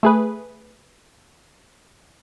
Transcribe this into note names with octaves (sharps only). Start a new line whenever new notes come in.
A3 G#4 B4